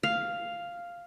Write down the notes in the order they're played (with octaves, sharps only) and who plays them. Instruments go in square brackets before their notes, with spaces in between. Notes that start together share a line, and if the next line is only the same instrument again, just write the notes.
[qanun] F5